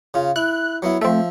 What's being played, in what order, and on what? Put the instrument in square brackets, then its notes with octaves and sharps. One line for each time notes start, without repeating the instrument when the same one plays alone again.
[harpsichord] C#3 F4
[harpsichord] E4 [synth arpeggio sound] F#6
[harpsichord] F#3 B3 E4
[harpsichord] F3 E5 [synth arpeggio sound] A3 C4